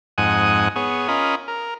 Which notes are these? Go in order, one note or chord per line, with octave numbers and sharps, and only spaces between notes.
F2 G#2 F#5 G#5 D#6
B3 G#4 C#5
C#4 F4 A#4 D#5 B5
A#4